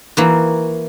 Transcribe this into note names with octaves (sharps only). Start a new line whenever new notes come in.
E3 A#3 F#4